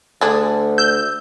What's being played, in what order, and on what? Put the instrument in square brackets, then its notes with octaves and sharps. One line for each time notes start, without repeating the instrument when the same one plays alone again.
[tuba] D2 [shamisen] D3 D4 G#4 [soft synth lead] A5
[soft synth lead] E6 [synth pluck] G6